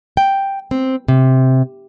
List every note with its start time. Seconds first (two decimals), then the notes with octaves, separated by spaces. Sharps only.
0.17 G5
0.71 C4
1.08 C3